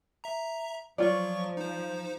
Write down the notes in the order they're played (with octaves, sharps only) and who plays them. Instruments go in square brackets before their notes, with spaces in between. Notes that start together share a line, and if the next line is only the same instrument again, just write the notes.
[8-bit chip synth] E5 A#5
[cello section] F3 [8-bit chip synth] F#3 C#6 [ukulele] F4 C#5 D5
[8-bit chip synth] D#4 C5